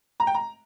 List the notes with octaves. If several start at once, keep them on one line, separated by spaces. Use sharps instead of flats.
A#5
G5
A#5